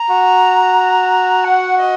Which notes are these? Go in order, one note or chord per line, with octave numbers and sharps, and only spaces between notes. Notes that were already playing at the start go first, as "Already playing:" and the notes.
Already playing: A#5
F#4
F#5
D#5